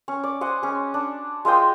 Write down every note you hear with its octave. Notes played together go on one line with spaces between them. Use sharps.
C#4
D5
C5 D#5 F#5 G#5
G#3 C#4
D4
G#3 F4 D#5 G5